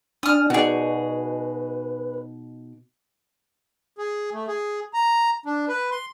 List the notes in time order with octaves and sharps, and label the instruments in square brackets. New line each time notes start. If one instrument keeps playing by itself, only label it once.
[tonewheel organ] D4 D5 G#5 [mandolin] D#6 F6
[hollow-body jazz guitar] B2 D#4 D5 [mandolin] F#4 G#4 [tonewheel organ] B4
[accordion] G#4
A3
G#4
A#5
D4
B4
C6